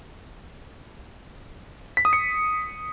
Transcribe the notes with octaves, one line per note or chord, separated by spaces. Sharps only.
B6
D#6
C#7